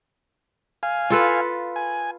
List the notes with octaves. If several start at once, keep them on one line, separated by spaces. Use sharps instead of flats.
F5 G#5
F4 A4 B4
G#5